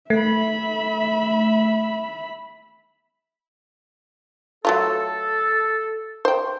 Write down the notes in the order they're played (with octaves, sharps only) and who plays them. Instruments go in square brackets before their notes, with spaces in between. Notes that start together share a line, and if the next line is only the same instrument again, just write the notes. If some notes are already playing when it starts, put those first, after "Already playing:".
[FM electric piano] A3 [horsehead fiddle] E5 B5
[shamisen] F#3 A3 F4 [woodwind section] A4
[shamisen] C5 G5